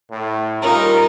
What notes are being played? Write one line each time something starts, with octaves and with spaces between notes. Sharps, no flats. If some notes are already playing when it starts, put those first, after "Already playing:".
A2
G3 C#4 D#4 F4 A#4